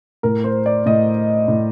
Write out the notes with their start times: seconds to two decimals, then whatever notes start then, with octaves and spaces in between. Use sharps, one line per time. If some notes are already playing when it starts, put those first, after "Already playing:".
0.23 A2 A#4
0.44 C5
0.66 D5
0.86 A2 D#5
1.48 A2